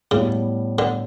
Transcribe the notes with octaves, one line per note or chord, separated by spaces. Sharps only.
A2 C#3 G3 B3
D3